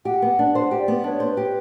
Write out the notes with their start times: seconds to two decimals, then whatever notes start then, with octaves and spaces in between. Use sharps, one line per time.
0.05 G4 F#5
0.22 B3
0.39 D4
0.55 C5 F#5
0.71 G4
0.79 D5
0.88 B3
1.04 D4 C#5
1.20 C5
1.28 B4
1.37 G4